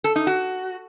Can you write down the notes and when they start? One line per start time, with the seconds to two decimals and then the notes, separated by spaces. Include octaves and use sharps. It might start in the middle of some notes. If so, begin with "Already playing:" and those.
0.04 A4
0.16 D#4
0.27 F#4